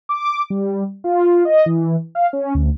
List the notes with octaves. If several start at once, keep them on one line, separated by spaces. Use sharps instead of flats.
D6
G3
F4
D#5
E3
F5
C#4
D2